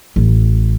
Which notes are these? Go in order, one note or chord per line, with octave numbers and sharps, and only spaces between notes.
A1